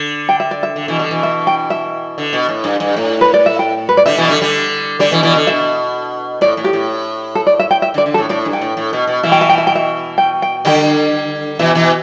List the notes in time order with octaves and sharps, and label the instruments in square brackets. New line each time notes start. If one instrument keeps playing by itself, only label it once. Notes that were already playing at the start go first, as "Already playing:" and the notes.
Already playing: [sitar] D3
[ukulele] G5
E5
D5
E5
[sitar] D3
B2 E3
D3 G3
B2 E3
[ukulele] E5
G5
E5
[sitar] D3
B2
A2
G2
G2
A2
[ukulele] B4
D5
E5
G5
B4
D5
[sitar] D3 G3 [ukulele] E5
[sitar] B2 E3
D3 G3
D3 G3
[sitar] D3 G3 [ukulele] D5
[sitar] B2 E3
[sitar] B2 E3 [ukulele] D5
[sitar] D3
[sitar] B2 [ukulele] E5
[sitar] A2 [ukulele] D5
[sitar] A2
[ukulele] G4
[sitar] A2
[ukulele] A4
D5
E5
G5
E5
[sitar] D3
[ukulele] D5
[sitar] D3
[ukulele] A4
[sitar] A2
[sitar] A2 [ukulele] D5
[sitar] G2
[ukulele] G5
[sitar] A2
A2
B2
B2
[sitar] B2 E3 [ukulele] E5
[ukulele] G5
E5
G5
E5
G5
E5
G5
G5
[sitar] D3 G3 [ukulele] G5
[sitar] B2 E3 [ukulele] E5
[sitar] B2 E3